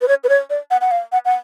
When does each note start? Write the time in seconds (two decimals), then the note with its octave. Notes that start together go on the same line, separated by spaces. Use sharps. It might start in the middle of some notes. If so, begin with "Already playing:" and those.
0.01 B4
0.08 C#5
0.24 B4
0.29 C#5
0.50 D5
0.71 F#5
0.81 F#5
0.91 F5
1.12 F#5
1.25 F#5